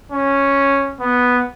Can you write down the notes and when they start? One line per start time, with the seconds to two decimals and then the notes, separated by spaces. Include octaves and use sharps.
0.12 C#4
1.00 B3